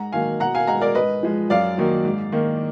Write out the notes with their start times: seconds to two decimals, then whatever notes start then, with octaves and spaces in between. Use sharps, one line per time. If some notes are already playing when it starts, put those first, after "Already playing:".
Already playing: G#2 F#5 A#5
0.12 D#3 F#3 A#3 F5 G#5
0.40 B2 F#5 A#5
0.54 F5 G#5
0.67 G#3 F#5 A#5
0.81 A#4 D5
0.95 G#2 B4 D#5
1.23 F3 G#3
1.50 F#2 D5 F5
1.78 D#3 F#3 A#3
2.05 G#2
2.32 D#3 A#3